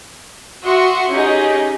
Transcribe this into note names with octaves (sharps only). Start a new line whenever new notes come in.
F#4 E5 F#5 C6 C#6 D#6
C#4 D#4 G4 G#4